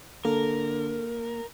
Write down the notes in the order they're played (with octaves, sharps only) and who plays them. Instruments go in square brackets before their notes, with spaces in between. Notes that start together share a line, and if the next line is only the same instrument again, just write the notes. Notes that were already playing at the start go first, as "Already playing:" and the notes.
[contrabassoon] D3 [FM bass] A#3 [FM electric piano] A4 [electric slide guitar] A#4